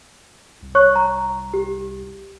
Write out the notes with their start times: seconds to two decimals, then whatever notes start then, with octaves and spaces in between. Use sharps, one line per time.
0.62 C2
0.75 C#5 C#6 F#6
0.96 A#5
1.54 G4